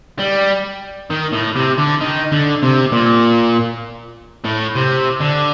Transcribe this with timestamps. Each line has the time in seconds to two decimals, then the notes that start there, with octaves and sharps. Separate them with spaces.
0.19 G3
1.11 D#3
1.33 A2
1.56 C3
1.78 D3
2.01 D#3
2.32 D3
2.63 C3
2.92 A#2
4.45 A2
4.75 C3
5.21 D3